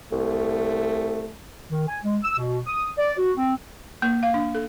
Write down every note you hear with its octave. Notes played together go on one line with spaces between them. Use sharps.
C2 A3
D#3
G#5
G#3
E6
B2
D#6
D5
F#4
C4
A#3
F5
D4
A4